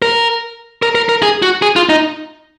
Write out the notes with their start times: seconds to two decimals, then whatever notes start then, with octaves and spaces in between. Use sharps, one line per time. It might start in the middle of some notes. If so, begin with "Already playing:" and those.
0.02 A#4
0.82 A#4
0.95 A#4
1.09 A#4
1.22 G#4
1.42 F#4
1.62 G#4
1.76 F4
1.89 D#4